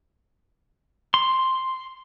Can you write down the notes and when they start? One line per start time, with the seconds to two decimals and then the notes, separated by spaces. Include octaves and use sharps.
1.14 C6